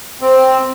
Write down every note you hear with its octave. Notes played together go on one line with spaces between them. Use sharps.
C4